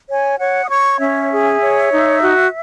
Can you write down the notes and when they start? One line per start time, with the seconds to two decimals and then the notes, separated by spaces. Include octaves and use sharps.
0.09 C#5 G#5
0.38 C#5 F#5
0.65 D#6
0.69 C#5 C#6
0.99 C#4 E5
1.31 G#4
1.61 C#5
1.91 D#4
2.21 F#4